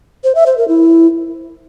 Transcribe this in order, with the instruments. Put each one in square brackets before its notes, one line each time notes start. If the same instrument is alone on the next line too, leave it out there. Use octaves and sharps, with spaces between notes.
[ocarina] C5
E5
C5
A#4
E4